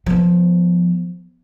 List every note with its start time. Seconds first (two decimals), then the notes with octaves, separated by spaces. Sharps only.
0.06 F3 B3